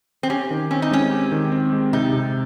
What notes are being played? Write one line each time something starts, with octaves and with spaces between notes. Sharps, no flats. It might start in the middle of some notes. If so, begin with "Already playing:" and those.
C4
C#4 G4
D#3
C4 C#4
D#4
G#3 C#4
G4
D#3
C4
G#3
C3 D#4
C3